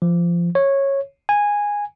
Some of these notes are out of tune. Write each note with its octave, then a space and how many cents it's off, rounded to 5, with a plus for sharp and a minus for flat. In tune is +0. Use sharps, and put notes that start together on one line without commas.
F3 -20
C#5 -10
G#5 -10